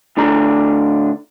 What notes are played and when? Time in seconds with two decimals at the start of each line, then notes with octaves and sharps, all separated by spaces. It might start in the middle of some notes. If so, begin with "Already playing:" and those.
0.17 A2 D3 D4 A#5